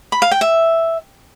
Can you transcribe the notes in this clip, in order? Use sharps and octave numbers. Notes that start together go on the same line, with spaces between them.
B5
F5
G5
E5